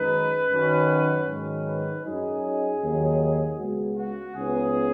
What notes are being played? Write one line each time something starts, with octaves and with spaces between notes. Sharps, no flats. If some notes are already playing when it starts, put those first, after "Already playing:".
Already playing: F#2 D#3 G#3 D#4 B4
F#2 D#3 F#3 C#4
G#2 D#3 F#3 C#4
B4
F#2 F#3 D#4 G#4
D#2 D#3 F#3
C#2 C#3 G#3 B3 F#4
F#4
C#2 C#3 B3 D#4 G#4